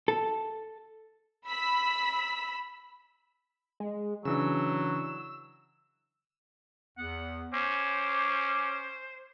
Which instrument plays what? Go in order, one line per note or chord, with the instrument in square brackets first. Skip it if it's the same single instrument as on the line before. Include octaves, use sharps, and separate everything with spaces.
[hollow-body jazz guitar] A4
[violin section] B5 E6 B6
[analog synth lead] G#3
[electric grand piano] C#3 E3 D4 [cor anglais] F#3 [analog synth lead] E6
[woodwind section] E2 B3 [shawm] F#5
[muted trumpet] C#4 [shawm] C5 [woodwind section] D6